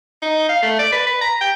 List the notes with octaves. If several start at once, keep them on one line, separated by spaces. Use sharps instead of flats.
D#4
F5
A3
D5
B4
B4
A#5
G5